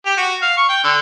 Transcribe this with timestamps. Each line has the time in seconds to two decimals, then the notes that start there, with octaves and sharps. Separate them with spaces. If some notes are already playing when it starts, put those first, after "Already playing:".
0.06 G4
0.17 F#4
0.42 F5
0.57 C#6
0.69 G5
0.84 D3